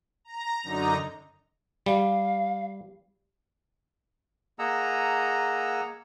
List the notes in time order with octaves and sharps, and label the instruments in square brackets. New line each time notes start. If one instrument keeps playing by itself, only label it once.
[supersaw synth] A#5
F#2 D3 D#4 A#5
[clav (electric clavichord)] G3 [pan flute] F5
[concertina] A#3 G#4 D#5 F#5 A#5 E6